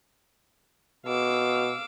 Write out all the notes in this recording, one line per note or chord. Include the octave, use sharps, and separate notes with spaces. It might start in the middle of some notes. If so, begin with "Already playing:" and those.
B2 F5 D6 E6